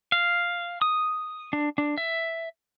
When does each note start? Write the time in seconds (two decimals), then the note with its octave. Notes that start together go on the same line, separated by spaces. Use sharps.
0.12 F5
0.82 D#6
1.53 D4
1.78 D4
1.98 E5